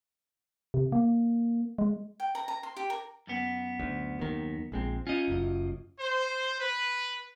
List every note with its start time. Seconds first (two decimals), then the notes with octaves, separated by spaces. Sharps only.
0.74 C3
0.92 A#3
1.78 G#3
2.20 G5
2.35 A#5
2.48 A#5
2.63 C6
2.77 G4
2.90 A#4
3.27 F#2 B3
3.80 D2
4.19 D#2 D#3
4.72 A#1 G#3 C4
5.07 C#4 F4 D#5
5.28 F#1 F#2
5.99 C5
6.60 B4